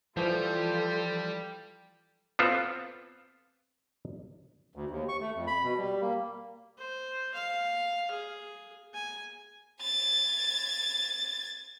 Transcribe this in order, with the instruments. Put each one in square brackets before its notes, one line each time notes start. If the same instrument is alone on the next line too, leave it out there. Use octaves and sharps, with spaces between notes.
[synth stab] E3 F3 [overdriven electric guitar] G3 [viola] F4 A4
[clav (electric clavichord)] B3 C4 F4 A4
[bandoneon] D2
D#2
C#6
A3
F2
B5
B2
G3
A#3
[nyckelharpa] C5
F5
G#4
G#5
[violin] G#6 A6